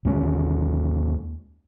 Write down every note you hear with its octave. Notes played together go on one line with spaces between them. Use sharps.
D#2 G#3 C#4